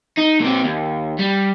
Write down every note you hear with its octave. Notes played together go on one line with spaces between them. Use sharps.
D#4
A#2 C4
D#2
G3